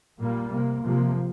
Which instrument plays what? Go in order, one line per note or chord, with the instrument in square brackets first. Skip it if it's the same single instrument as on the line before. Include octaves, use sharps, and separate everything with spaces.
[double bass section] A#2 G3 A#3
C3 A#3
C3 F3 A#3